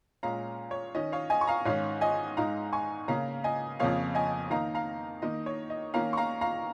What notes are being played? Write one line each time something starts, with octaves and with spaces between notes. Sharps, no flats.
A#2 G#3 C#4 F5 A#5
C#5
D#3 C#4 D#5
C#5 F5
D#5 G#5
C#6
F5 A#5
G#2 D#3 C#4 C#5 F5
D#5 G#5
G#2 G#3 D#4 F5 A#5
G#5 C#6
C#3 A#3 C#4 F5 A#5
D#5 G#5
F2 C#3 F3 A#3 C#5 F5
D#5 G#5
D#3 A#3 D#4 F5 A#5
F5 A#5
D#3 A#3 D#4 D#5
C#5
D#5
D#3 A#3 C#4 F5 A#5
C#6
F5 A#5
F5 A#5